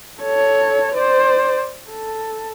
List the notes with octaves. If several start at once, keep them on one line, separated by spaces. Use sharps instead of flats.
A4 C#5
C5 D5
A4